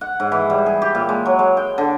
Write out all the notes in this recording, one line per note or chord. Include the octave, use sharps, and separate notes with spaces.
F#5
G#2
E3
G3
G#4
G4
A#2
G#3
F#3
G#3
G5
D3